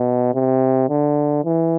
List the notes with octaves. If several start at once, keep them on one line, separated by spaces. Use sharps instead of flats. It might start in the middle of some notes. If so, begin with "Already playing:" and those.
Already playing: B2
C3
D3
E3